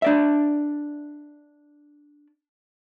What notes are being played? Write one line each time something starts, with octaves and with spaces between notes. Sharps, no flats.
D4 D5 E5